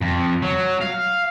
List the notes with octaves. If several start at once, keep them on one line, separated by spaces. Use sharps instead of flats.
F2
F#3
F5